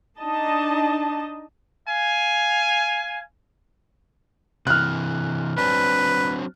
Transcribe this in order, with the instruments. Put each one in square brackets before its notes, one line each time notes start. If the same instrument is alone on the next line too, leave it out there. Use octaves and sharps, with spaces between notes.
[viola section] D4 D#4 D#5 A5
[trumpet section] F5 G#5
[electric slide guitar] C3 E3 [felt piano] F6 F#6
[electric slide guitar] F#3 C4 D4 [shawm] B4